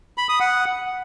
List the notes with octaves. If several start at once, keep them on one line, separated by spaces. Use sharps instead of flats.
B5
D#6
F#5